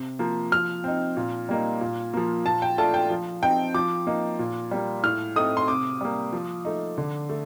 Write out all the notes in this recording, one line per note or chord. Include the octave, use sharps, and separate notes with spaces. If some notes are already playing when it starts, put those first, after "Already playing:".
Already playing: C3
F3 A#3
F3 F6
C4 D#4
A#2
G3 A#3 D#4
A#2
F3 A#3
A#2 A5
G5
A3 D4 F4 A5
G5
F3
C4 D#4 G5
F3 D6
A#3 D#4
A#2
G3 A#3
A2 F6
A3 C4 D#4 D#6
C6
C3 D6
G3 A#3
F3
A3 D#4
D3
A3